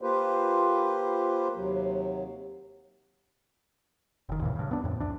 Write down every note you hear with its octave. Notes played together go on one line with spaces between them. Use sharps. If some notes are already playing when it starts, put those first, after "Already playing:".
A#3 F4 G4 B4 C5
D#2 C3 F#3
F#1 D#3
D#2 A#2 C#3 E3
G2 C#3
B3 D4
F2 A2
C2 E3 D4